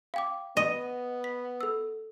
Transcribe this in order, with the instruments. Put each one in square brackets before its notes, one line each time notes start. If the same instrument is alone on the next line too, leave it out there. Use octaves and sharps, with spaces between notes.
[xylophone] F5 G5 D6
[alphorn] B3 [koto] D#5
[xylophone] B6
A4 E6